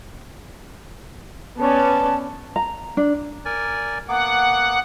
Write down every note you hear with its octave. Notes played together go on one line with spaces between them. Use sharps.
B3 C#4 D5 A5
A#5
D4
A#4 D5 G#5
A#3 B3 F#5 D6